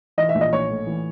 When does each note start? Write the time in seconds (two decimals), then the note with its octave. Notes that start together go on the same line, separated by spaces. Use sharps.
0.18 E3 D#5
0.29 E5
0.35 A#1
0.41 D#5
0.52 A#1 C#5
0.69 A2
0.87 E3